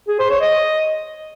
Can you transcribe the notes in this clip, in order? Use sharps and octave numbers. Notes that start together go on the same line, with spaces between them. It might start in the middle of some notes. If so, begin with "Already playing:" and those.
G#4
C5
C#5
D#5